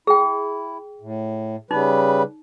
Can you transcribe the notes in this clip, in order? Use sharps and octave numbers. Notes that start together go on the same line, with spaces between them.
E4 G#4 G5
A2
C#3 G3 D#4 B4